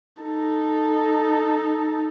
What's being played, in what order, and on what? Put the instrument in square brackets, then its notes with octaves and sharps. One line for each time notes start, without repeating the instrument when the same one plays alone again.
[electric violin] D#4 A4